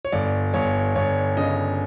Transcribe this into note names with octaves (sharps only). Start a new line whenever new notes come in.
C#5
G1 D5
G1 C#5
G1 C#5
C#3 D#5